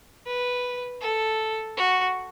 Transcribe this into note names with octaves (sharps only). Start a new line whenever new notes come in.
B4
A4
F#4